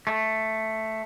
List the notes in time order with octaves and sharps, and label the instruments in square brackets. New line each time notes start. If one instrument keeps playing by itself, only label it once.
[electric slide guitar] A3